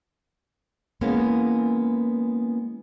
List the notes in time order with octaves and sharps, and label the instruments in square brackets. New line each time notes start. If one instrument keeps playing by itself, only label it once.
[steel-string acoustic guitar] E3 G#3 A#3 B3 C#4